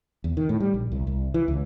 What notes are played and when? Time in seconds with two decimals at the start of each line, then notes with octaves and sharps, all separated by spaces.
0.24 E2
0.37 D#3
0.49 A2
0.60 G3
0.74 A#1
0.92 C2
1.07 C2
1.34 E3
1.48 C#2